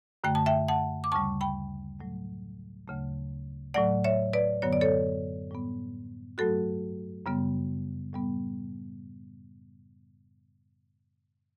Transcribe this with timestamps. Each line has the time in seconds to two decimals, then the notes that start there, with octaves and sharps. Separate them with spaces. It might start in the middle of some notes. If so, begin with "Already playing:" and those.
0.24 F#2 D3 A3 G5
0.35 A5
0.46 E5 G5
0.68 F#5 A5
1.04 D6
1.12 D2 C#3 G3 A5 C#6
1.41 G5 B5
1.99 A2 F#3 A3
2.88 D2 C#3 F#3 A3
3.74 A2 F#3 A3 D5 F#5
4.04 C#5 E5
4.33 B4 D5
4.62 F#2 D3 F#3 B3 C#5
4.73 D5
4.81 A4 C#5
5.51 A2 G3 B3
6.38 G2 F#3 A3 F#4 A4
7.26 F#2 C#3 G3 B3
8.13 A2 G3 B3